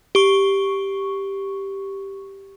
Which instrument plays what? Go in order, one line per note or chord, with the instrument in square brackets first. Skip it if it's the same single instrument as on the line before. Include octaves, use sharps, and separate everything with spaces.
[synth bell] G4 C#6